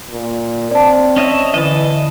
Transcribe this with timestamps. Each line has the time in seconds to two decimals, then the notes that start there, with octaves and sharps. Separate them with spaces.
0.10 A#2
0.71 C4 D5 A5
1.16 C#4 D#5 E5
1.54 D3 E3 D#5 A5